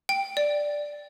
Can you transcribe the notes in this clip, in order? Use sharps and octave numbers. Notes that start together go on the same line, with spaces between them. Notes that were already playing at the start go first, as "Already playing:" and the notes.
G5
D5